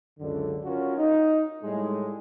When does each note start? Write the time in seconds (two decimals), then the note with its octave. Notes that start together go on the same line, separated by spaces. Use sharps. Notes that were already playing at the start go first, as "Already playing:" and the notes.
0.19 C#2 F#2 D3
0.64 C#4 F4 F#4 A#4
0.98 D#4
1.64 A2 G3 G#3